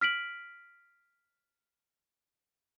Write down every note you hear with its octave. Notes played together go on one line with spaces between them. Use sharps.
F6 B6 D7 F#7